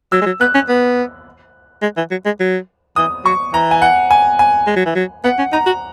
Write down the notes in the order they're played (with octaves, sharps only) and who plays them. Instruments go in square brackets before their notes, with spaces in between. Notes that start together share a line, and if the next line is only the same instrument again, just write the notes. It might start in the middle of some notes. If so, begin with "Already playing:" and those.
[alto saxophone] F#3 [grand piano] E6
[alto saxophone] G#3
F#3
[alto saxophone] B3 [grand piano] F#6
[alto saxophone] C#4
B3
G#3
E3
F#3
G#3
F#3
[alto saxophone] E3 [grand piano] D#6
[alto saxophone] F#3 [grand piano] C#6
[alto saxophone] E3 [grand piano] A#5
[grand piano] G#5
F#5
G#5
G#5
[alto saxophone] G#3
F#3
E3
F#3
[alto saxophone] B3 [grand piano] F#5
[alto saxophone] C#4
[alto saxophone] D#4 [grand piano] A#5
[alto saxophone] F#4